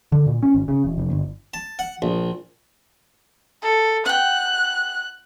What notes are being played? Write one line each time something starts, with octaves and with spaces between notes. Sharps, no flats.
D3
A#2
C#4
G#1
C#3
E1
F1
G1
A5
F#5
A#1
A4
F#5 G5 F#6